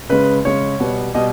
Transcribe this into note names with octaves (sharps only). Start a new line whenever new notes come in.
C#3 G#3 C#4 B4
C#3 G#3 C#4 C#5
B2 G3 B3
B2 G3 D#5